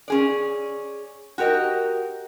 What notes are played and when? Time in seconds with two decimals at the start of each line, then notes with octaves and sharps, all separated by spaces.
0.08 C#4 G#4 D5
1.38 F#4 G4 A#4 D5 D#5